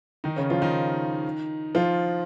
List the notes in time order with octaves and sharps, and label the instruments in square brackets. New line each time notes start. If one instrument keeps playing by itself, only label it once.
[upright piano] D#3 D#4
C#3 C#4
F3 F4
D#3 D#4
F3 F4